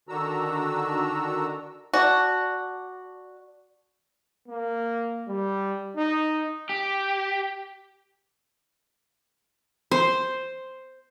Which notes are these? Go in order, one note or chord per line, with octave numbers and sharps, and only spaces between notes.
D3 D#3 D4 F#4 A#5 E6
F#4 D5 A5
A#3
G3
D#4
G4
C5